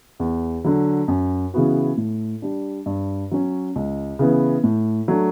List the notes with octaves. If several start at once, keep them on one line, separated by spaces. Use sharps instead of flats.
E2
D3 F#3
F#2
C#3 E3 B3 F#4
A2
G3 D4
G2
F#3 C#4
C#2
C#3 E3 B3
A2
F#3 A3 D4